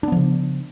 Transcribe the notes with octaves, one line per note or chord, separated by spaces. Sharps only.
C#3 F3 B3 D4